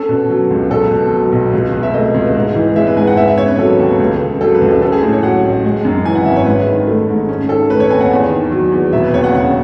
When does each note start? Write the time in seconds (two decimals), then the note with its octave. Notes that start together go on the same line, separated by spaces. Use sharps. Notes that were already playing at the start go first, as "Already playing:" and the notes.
Already playing: C#4 A4
0.09 B2
0.30 F#3
0.50 C#2
0.71 B1 A4
0.91 B2
1.12 F#3
1.32 B1
1.53 C#2
1.74 B2
1.83 E5
1.94 A3 D#5
2.14 C#2
2.35 G#2
2.56 E3
2.76 G#3 E5
2.87 B4
2.97 G#2 G#5
3.07 F#5
3.17 B3 E5
3.28 E5
3.38 C#3 C#5
3.48 B4
3.58 F#3 A4
3.80 D#2
4.00 C#2
4.20 C#3
4.41 F#3 A4
4.54 B4
4.62 C#2
4.69 A4
4.82 C#4 A4
4.92 G#4
5.03 A2
5.13 C#5
5.23 F#3 F#5
5.44 A1
5.64 G#3
5.85 F#2
6.06 E3 G#5
6.15 F#5
6.25 G#1 E5
6.36 C#5
6.46 G#2 B4
6.67 D#3
6.87 A3
7.09 G#2
7.29 C#4
7.49 D#3 A4
7.70 A3 B4
7.80 C#5
7.90 D#2 G#5
8.01 F#5
8.11 E2
8.31 D#3
8.52 F#3
8.72 E2
8.93 E1 E5
9.04 B4
9.14 D#2 C#5
9.24 F#5
9.34 C#3 F#5